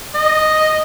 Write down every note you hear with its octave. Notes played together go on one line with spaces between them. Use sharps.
D#5